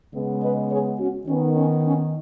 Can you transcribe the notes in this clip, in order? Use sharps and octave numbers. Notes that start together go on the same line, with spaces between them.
C#3 G#3 B3
B4 D#5
G#4 C#5
C#4 F#4
D#3 B3 C#4
C#4
C#4